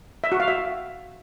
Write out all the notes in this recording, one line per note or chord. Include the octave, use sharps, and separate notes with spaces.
E5
F#4
F5
E5